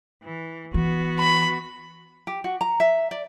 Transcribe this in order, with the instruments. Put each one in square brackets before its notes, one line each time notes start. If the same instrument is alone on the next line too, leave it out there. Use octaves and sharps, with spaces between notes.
[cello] E3
[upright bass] E3 [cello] B3 F#4
[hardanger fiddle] B5
[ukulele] G4
F#4
A#5
E5
D5